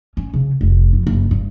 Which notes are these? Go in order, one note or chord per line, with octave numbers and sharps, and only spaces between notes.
C#4
C#3
F1
F2
F#1
G2